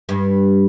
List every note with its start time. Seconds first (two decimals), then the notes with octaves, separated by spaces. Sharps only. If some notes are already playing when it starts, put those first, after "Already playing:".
0.09 G2